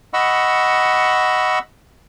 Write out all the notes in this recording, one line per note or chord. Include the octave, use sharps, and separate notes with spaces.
D#5 F#5 B5 C#6 E6